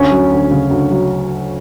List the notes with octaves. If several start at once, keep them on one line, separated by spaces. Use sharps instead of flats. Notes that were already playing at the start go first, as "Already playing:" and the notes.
Already playing: D2 C#4
F#3
D2
C#3
D2
F#3